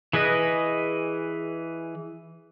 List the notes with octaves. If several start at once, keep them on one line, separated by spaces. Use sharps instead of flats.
E3 G#4 B4 D#5